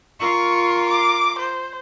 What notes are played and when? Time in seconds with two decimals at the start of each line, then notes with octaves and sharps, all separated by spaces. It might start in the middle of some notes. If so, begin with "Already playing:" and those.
0.20 F4 A#4 C#6
0.88 D6
1.39 C5